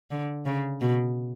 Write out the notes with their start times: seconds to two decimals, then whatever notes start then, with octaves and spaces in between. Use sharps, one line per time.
0.11 D3
0.46 C#3
0.81 B2